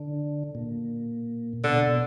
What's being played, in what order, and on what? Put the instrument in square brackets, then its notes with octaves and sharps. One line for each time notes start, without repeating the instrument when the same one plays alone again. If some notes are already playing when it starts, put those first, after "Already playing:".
Already playing: [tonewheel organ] D3
A#2
[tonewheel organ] B2 [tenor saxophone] D3
[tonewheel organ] B2